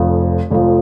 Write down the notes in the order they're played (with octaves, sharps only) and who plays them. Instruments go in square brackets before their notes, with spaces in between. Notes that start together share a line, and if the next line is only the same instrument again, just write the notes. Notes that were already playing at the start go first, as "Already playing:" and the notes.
Already playing: [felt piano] F1 F2 F3
F1 F2 F3